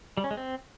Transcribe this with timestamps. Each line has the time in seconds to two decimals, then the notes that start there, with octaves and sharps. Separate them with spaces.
0.17 G3
0.24 C#4
0.31 G#3
0.37 C4